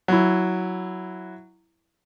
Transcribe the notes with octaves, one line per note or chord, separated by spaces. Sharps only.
F#3 E4